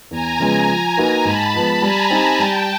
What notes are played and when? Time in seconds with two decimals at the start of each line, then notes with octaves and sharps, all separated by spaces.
0.11 E2 G#5 A#5
0.40 C#3 F3 G#3 B3
0.69 F3
0.97 A#3 D#4 F#4 B4
1.25 G#2 A5 B5
1.54 F3 G#3 B3
1.82 G3 G#5 A#5
2.10 C4 D#4 G4
2.39 G3 G5 A5